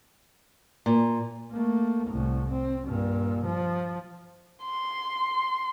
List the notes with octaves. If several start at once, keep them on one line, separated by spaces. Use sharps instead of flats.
A#2
A3 A#3
C2 A2
C4
G2 A#2
F3
C6